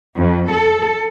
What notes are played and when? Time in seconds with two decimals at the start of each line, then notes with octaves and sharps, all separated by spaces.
0.18 F2
0.51 A4